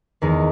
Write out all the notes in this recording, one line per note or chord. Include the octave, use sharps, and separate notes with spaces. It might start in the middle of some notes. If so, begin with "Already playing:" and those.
E2 D#3 G#3 D#4